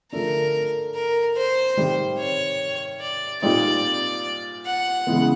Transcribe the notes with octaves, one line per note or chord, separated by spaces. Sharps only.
D3 F3 A3 D4 A#4
A#4
C5
C3 D#3 G3
C#5
D5
A#2 G3 C4 D#4 D5
F#5
C#3 E3 G#3 B3